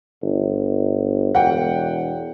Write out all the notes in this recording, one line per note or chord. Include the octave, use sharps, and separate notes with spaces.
G1
E1 F#5 G5